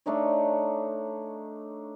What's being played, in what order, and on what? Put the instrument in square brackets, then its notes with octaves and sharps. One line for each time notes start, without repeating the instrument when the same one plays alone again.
[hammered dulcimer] A3 D4 D#4 C#5